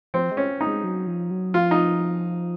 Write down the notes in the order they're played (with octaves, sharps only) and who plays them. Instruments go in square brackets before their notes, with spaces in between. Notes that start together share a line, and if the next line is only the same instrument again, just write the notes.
[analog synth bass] F3 [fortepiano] C4
[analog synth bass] G#3
[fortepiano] C#4
D#4
[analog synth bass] G#3
F#3
F3
F#3
[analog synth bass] F3 [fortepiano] F4
[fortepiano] D#4